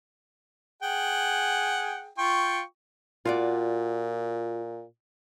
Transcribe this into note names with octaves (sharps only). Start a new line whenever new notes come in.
G#4 F#5 G5
F4 G5 C#6
A#2 F4 F#4 D5